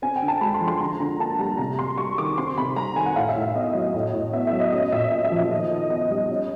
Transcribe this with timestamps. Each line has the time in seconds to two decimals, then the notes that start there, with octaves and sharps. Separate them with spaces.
0.02 C4 G#5
0.16 G5
0.22 D3
0.28 A5
0.41 G#3 B5
0.54 C6
0.61 F3
0.68 C6
0.80 D3 A#5
1.00 D3 A#5
1.19 A#3 A5
1.39 G3 A#5
1.58 C3 A#5
1.79 C3 C6
1.98 G3 C#6
2.18 D#3 D6
2.37 C4 C6
2.58 C3 B5
2.76 G3 A#5
2.96 D#3 G#5
3.06 F#5
3.15 A2 F5
3.29 E5
3.36 A2
3.42 E5
3.55 B3 D#5
3.74 F#3
3.94 A2
4.13 A2
4.33 B3 E5
4.47 E5
4.53 F#3
4.60 D#5
4.72 C#4 D#5
4.92 A#2 E5
5.12 A#3 E5
5.25 E5
5.32 F3
5.38 E5
5.51 D#3 D#5
5.71 D#3
5.76 D#5
5.90 B3 D#5
6.11 G3
6.30 C#4